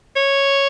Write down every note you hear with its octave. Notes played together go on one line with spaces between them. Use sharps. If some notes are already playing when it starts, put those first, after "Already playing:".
C#5